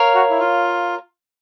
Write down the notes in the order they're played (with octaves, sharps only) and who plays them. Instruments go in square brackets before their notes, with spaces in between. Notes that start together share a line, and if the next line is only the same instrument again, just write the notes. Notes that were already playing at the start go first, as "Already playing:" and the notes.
Already playing: [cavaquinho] A#4 C#5 F5
[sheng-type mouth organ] F#4
E4
F4